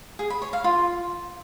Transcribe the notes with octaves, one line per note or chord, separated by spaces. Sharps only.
G#4
B5
C#5
F5
F4